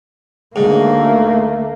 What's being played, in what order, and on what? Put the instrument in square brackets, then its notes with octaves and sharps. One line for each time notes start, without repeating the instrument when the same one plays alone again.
[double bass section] D2 D3 [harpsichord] G#2 [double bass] A3 A#3